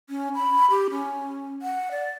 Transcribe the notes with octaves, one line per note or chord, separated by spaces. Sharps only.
C#4
B5
G4
C#4
F#5
D5